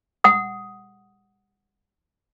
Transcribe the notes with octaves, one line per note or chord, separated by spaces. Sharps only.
F#5 D#6